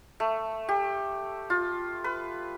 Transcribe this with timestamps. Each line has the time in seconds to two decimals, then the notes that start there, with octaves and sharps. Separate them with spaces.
0.20 A3
0.69 G4
1.50 F4
2.04 B4